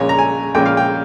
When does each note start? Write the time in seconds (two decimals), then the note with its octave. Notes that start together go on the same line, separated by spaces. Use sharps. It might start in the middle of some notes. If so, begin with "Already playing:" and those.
Already playing: A#1 A#2 G#3 C#4 C#5
0.09 A#5
0.19 G#5
0.55 A#1 A#2 G#3 C#4 G5
0.66 F5
0.77 G5